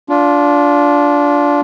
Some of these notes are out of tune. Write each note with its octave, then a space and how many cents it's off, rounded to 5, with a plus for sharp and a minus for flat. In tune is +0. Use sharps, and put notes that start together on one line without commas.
D4 -20 F4 +5